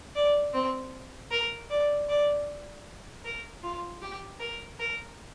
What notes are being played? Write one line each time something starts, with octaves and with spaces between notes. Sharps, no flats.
D5
C4
A#4
D5
D5
A#4
F4
G4
A#4
A#4